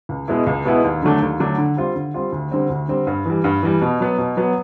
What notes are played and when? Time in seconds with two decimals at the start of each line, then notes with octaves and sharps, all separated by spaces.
0.09 C#2
0.28 B2 G#3 B3 E4
0.47 C#2
0.65 B2 G#3 B3 E4
0.84 D#2
1.02 D3 F#3 A3 D4
1.21 D#2
1.40 D3 F#3 A3 D4
1.58 D3
1.77 G3 C4 F4
1.95 D3
2.14 G3 C4 F4
2.32 D2
2.52 D3 G3 C4
2.70 D2
2.88 D3 G3 C4
3.07 G2
3.26 E3 G3
3.44 G2
3.63 E3 G3
3.81 B2
4.00 F#3 B3
4.18 B2
4.37 F#3 B3